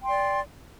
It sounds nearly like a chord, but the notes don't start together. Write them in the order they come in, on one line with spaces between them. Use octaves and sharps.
G5 C6 D5